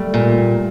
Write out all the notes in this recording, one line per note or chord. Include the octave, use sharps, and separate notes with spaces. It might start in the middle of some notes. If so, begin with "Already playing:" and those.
Already playing: G3 A3
A#2